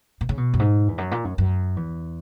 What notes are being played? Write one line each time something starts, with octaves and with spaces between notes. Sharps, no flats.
B2
C#3
B2
F#2
G#2
E2
F#2
A#2
F#2
F#2
E2